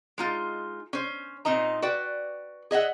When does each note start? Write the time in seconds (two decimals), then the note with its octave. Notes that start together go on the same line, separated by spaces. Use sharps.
0.18 G#3 D#4 F4
0.93 C#4 C5
1.45 A#2 C4 D#4 D#5 A#5
1.82 F#4 B4 D5 G5
2.71 G#4 D#5 E5 F#5